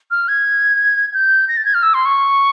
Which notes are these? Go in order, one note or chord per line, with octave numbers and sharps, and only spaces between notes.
F6
G#6
G6
A#6
A6
G#6
F6
E6
C6
C#6